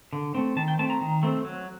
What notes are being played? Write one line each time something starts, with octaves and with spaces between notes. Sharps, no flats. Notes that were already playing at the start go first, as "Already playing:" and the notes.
D3
A3 C4
D#3 A5
G5
A3 C4 A5
A#5
D#3
A3 C4
F#3